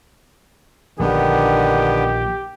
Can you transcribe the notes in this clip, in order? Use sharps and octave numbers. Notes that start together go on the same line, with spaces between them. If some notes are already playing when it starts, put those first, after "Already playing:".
A#1 D3 D#3 B3 G4